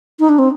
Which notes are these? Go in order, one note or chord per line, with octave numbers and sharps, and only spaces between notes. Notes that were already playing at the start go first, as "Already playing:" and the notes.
D#4
D4
C4